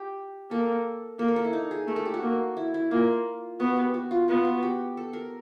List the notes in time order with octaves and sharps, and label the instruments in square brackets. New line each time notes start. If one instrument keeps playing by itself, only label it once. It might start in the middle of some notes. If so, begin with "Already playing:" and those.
Already playing: [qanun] G4
[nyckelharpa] A#3 [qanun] A4
[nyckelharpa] A#3 [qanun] A4
[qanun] A#4
A4
E4
D#4
G#4
[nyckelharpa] A3 [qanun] A#4
[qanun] A4
G4
F#4
[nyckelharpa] A#3
[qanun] E4
E4
[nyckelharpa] A#3 [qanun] F4
[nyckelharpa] B3 [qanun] F#4
[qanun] G4
F#4
F4
[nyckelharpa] B3 [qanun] F4
[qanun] F#4
G4
A4
A#4